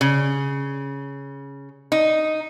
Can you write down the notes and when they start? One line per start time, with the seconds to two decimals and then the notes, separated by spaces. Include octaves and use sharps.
0.01 C#3
1.92 D#4